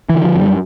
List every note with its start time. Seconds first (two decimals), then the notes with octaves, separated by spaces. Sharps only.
0.10 D3 E3
0.24 F3
0.35 F#2
0.41 G3